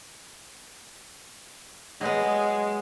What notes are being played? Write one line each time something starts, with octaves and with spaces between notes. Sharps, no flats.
F#3 G#3 B3